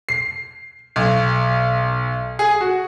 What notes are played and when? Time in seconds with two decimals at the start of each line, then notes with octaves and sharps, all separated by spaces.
0.09 C7
0.96 B1
2.39 G#4
2.61 F#4